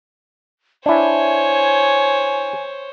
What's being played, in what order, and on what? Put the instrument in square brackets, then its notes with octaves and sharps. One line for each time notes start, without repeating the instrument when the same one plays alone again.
[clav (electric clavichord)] D4 E4 [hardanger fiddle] C5 C#5 [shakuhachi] G#5